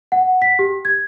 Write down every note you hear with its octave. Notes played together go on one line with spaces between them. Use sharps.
F#5
B6
G4
G#6